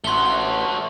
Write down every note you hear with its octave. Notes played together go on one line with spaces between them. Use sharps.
A1 A3 F#4 C6 G7